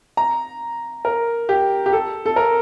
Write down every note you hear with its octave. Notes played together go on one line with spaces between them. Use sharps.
A#5
A#4
G4
G4
A4
A4
A#4